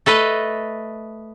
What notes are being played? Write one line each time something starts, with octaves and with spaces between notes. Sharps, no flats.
A3 A4 B4 D#5